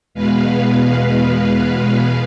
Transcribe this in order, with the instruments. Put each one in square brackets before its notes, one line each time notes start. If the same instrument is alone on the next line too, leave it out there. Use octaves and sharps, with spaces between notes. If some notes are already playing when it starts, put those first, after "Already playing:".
[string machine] E2 B2 G#3 B4 F5